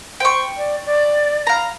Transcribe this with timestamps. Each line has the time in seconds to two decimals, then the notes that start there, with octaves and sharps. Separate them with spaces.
0.20 C5 G5 C#6
0.57 D5
0.86 D5
1.47 F5 A#5